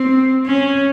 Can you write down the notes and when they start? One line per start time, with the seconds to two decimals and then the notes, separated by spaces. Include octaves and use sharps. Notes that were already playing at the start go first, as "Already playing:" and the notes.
Already playing: C4
0.46 C#4